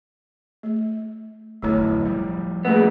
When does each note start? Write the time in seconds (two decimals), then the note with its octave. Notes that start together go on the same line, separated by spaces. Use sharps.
0.63 A3
1.62 D1 B1 F2 A3 E4 C#5
2.05 F3 G3
2.65 A#2 A3 B3 C#4 G#4